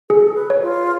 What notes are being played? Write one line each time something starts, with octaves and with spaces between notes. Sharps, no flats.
G#4 A4
B4
C#5
F4